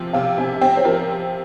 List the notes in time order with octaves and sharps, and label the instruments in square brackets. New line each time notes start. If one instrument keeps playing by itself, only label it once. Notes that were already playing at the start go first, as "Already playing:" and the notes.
Already playing: [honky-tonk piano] C3 F3 C4
[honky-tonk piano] C3 [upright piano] F5
[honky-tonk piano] C3 [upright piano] G#5
[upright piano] G#5
[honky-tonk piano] C4 [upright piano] G5
[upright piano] C5
[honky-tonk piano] F3 [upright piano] A#4